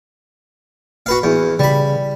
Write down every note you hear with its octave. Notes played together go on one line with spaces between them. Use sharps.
F#4 B4 F5
E2
C#3 G3 B5